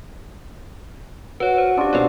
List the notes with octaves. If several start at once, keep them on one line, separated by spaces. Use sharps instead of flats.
F#4 B4 C#5
C5
C#4 D4 F4 G4 C#6
G#2 B2 C4 C#5